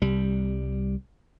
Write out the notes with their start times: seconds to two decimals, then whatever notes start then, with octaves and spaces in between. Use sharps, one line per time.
0.02 C2 G3